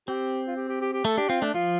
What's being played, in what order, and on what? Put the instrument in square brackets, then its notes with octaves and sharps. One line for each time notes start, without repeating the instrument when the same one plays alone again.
[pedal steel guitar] C4 [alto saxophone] G4
[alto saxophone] F4
G4
G4
G4
G4
[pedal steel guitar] A3 [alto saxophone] A4
[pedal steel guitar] D4 [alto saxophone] G4
[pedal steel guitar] C4 [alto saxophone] F4
[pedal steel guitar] A3 [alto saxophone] D4
[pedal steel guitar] F3 [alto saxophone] F4